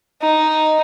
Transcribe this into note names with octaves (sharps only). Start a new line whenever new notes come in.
D#4